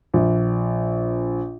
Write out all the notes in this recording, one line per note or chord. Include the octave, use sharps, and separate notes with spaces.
A#1